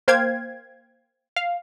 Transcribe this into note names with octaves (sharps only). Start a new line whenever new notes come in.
A#3 C5 F5 G5 G#6
F5